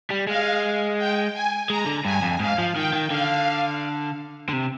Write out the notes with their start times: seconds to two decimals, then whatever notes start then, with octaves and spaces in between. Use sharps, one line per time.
0.10 G3
0.27 G#3 F5
0.98 G5
1.34 G#5
1.69 G#3 A#5
1.86 D3
2.04 G2 G#5
2.22 F2
2.40 G#2 F5
2.58 F3
2.76 D#3 G5
2.93 D#3
3.11 D3 F5
4.49 D3
4.53 C3